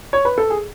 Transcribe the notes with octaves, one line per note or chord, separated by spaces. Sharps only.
C#5
B4
A4
G#4